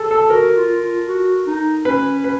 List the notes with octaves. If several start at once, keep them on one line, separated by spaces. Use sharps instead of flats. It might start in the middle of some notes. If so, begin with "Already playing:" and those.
Already playing: G#4 A4
A4
F#4 A#4
F4
F4
F#4
D#4
C#4 B4
B4